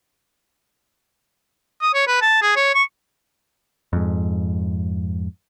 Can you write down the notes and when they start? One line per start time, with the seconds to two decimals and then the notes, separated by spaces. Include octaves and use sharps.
1.82 D#6
1.94 C#5
2.07 B4
2.22 A5
2.42 G#4
2.56 C#5
2.75 C#6
3.93 F2 G#2